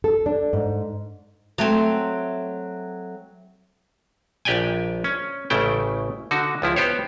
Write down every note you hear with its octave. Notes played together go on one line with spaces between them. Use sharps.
A4
D4
G#2
F#3 A3 C4
A#1 G4 D5 G5 G#5
C#4
A1 C#3 A3 E4 G5
D3 D#4 F#4
C#2 F3 E4
B3 G4 C5 C#5